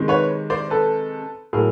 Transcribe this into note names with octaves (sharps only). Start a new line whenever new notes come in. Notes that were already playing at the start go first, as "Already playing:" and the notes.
Already playing: C3 D#3 G#3
B4 C#5
C5 D5
A4 B4
A2 F#3 G#4 A#4